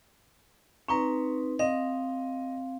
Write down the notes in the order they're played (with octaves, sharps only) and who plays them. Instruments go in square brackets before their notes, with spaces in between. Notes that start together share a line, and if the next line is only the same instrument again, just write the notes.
[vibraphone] C4 D#4 B4 [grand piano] A#5 C#6
[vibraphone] C4 F5 [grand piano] D#5